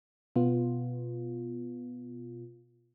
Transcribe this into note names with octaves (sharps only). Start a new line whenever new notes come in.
B2 B3 F4